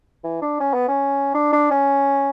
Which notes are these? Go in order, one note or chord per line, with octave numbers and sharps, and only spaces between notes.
E3
D4
C#4
B3
C#4
D4
D4
C#4